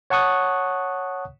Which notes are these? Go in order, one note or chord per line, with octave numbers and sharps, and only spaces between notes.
C#5 F#5 A5 C#6 D#6 F#6